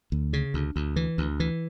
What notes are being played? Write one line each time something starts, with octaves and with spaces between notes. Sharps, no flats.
D2
C#3
D2
D2
E3
D2
E3